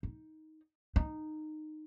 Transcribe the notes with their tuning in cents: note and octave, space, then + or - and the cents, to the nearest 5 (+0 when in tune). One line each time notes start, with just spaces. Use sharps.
D#4 +10
D#4 -15